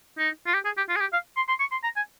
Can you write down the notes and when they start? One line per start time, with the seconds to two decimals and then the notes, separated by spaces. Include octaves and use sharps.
0.18 D#4
0.46 F4
0.54 G4
0.65 G#4
0.77 G4
0.89 F4
0.96 G#4
1.00 G4
1.13 F5
1.37 C6
1.48 C6
1.60 C#6
1.72 C6
1.83 A#5
1.96 G#5